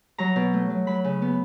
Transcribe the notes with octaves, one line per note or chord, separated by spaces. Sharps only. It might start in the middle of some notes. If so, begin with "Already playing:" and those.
F#3 A#5
B2
A3
F#3
F#3 B5
C#3
B3